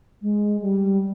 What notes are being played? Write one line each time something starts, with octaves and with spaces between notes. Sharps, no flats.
G#3
G3